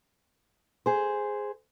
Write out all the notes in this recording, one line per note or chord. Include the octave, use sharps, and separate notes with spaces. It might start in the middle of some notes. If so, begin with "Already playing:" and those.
G#4 C5